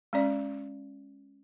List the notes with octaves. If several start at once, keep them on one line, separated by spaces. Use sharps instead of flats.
G#3 C#4 D5